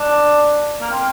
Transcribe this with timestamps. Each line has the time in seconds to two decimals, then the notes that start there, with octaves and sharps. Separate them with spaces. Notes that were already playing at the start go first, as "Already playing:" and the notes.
Already playing: D4
0.81 A#3
0.91 C4